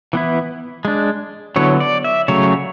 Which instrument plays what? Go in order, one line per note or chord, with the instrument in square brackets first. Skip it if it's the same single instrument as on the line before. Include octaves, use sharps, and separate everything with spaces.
[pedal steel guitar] E3 B3 E4
G#3 D4
D3 F#3 B3 E4 C#5
D5
E5
C#3 F#3 A3 C#5